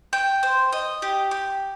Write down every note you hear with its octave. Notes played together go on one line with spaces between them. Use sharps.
G5
C5
D#5
G4
G4